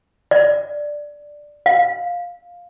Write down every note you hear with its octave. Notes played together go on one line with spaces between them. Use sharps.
D5
F5